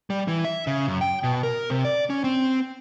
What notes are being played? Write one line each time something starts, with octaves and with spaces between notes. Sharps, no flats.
G3
E3
E5
C#3
F#2
G5
B2
A#4
C3
D5
C#4
C4